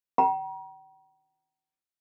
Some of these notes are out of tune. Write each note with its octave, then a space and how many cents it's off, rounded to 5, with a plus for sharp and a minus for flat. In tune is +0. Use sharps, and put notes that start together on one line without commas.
G5 -45 A#5 +40